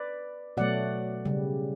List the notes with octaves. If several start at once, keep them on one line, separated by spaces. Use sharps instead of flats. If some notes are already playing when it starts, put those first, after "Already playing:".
Already playing: B4 D5
B2 F#3 A3 D5 F#5
C#3 G3